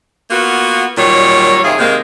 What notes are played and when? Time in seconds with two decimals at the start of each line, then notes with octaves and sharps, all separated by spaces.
0.30 A#3 B3 F4 F#4
0.97 A#2 D#3 F#3 G3 C#5
1.63 D#2 C3 F4 G#4
1.79 C3 D#3 G#3 A#3